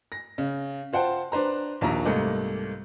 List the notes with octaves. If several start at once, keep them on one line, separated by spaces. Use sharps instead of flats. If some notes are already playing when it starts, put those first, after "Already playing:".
A#6
C#3
F4 C5 F#5 G5 A5
D4 B4 C5 A#5
A#1 D#2 A#2 A#5
C2 G#2 A3 A#3 D#5